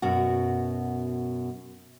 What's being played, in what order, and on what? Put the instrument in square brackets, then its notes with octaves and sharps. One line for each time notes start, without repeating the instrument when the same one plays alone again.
[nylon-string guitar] F#2 B2 F#4